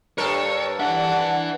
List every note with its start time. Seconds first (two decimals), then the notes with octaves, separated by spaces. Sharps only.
0.18 G2 A4 A#4 C#5
0.80 D4 B4 E5 F#5